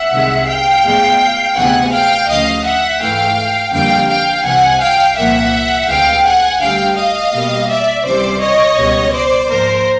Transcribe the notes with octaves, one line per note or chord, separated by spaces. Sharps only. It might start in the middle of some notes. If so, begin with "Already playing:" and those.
Already playing: E5 F#5
C2 C3 D#3 G#3
F5 G5
A2 F3 G#3 B3
D2 C3 E3 G#3 B3 F#5 G#5
F5 G5
D2 C#3 F3 D#5 F5
E5 F#5
G#2 E3 A3 F5 G5
F2 D3 G3 A#3 F5 G5
F5 G5
C2 C3 E3 F#5 G#5
F5 G5
C2 A#2 F3 A#3 E5 F#5
D2 C3 E3 G#3 F5 G5
F#5 G#5
D2 D3 G3 F5 G5
D#5 F5
B2 G3 A#3
D5 E5
C#2 C3 E3 G3 C5 D5
C#5 D#5
C#2 B2 G3 B3
C5 D5
G#2 F3 A#3 A#4 C5